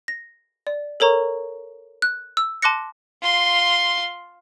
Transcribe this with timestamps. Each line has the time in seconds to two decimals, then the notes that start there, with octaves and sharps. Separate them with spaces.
0.08 A#6
0.67 D5
1.00 A4 A#4 C#5 A#5 C#6
2.02 F#6
2.37 E6
2.62 A5 C6 D6 F#6 A#6 C#7
3.22 F4 C6